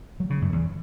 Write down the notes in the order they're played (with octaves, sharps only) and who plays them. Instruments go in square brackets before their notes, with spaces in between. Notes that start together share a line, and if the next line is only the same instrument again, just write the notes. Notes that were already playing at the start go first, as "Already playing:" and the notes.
[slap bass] F#3
C#3
F#2
E2